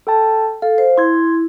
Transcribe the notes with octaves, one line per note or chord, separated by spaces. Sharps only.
A4 G5 A5
A4 F5
C5
E4 C6 G#6